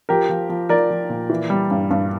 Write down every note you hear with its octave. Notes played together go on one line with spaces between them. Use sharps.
F3 G4 A#4
F3
F3
F3 A#4 D5
F3
A#2
E3
G3
G2
G2